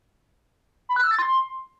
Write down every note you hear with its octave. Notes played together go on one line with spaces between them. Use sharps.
B5
F#6
E6
A6
C6